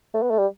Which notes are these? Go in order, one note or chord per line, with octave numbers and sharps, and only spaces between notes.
A3
B3
A3
G3